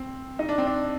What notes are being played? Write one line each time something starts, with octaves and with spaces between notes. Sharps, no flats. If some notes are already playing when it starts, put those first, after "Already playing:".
Already playing: C4
D#4
D4
C4
D4